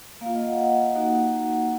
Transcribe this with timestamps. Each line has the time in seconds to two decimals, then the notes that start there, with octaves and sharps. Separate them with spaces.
0.21 A#3 F5
0.26 F4
0.34 D#5
0.46 F#5
0.59 F#5
0.95 A#3 D#4 F#4